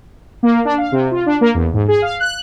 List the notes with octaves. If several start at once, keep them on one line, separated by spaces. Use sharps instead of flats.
A#3
D4
F5
C3
F4
D4
A#3
E2
G#2
G#4
F5
F#6